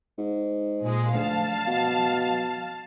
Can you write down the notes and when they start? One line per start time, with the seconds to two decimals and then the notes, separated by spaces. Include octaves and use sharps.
0.18 G#2
0.83 A#2 G#3
1.13 D2 F5 A5
1.67 B2